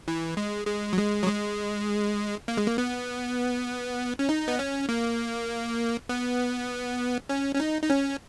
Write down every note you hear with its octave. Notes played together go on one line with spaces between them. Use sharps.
E3
G#3
G#3
F#3
G#3
F#3
G#3
A#3
G#3
A#3
B3
C#4
D#4
B3
C#4
A#3
B3
C#4
C#4
D#4
D#4
C#4